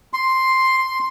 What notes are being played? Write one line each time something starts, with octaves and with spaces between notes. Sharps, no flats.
C6